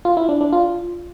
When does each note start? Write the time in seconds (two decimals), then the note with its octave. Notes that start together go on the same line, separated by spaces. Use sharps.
0.05 F4
0.17 E4
0.29 D4
0.41 D4
0.53 F4